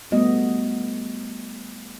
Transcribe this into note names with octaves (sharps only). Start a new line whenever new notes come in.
G3 A3 B3 F#4 D#5